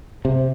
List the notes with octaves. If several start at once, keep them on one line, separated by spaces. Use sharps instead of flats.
C3